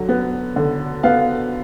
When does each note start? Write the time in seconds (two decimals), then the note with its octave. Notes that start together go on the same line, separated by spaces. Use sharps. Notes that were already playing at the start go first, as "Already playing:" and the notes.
Already playing: D3 F#3
0.09 B3
0.56 D3
1.03 B3 F5